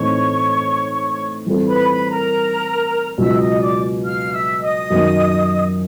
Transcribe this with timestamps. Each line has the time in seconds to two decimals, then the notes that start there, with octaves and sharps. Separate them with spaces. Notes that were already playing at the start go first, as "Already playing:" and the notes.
Already playing: A2 E3 A3 C4 D#4 C#5 C#6
1.46 E3 G3 C4 F4 A4
1.67 B4 B5
1.88 B4 B5
2.10 A#4 A#5
3.18 C#2 B2 F#3 B3 E5 E6
3.39 D#5 D#6
3.60 D5 D6
4.04 F5 F6
4.32 E5 E6
4.62 D#5 D#6
4.90 F#2 D#3 F#3 A#3